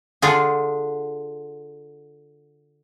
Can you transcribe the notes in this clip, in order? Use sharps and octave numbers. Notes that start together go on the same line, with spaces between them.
D3 F4 G#4